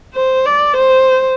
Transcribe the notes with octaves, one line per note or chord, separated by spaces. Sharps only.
C5
D5
C5